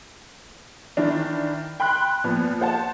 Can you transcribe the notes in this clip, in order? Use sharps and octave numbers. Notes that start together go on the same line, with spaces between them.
D#3 E3 D4
G5 B5 C6 F#6
A#2 F3 B3
C5 F#5 A5